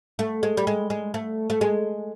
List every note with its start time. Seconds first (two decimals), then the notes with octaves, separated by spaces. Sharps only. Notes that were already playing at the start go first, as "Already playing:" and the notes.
0.19 A3
0.43 G#3
0.57 G3
0.67 G#3
0.90 G#3
1.14 A3
1.50 A3
1.61 G#3